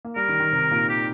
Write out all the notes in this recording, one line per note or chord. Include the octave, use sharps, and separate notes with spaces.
A#3
G3 A#4
D#3
D#3
C3
A#2
G4